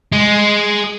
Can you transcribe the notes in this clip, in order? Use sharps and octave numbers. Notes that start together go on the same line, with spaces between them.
G#3